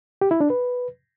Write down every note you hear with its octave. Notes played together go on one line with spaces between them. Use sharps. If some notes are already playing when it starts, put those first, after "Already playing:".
G4
E4
D4
B4